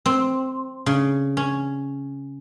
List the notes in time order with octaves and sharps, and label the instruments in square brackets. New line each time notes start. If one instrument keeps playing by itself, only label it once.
[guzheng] C4
C#3
C#4